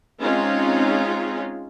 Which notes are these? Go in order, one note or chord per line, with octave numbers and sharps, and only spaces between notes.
G#3 C4 C#4 D#4 F4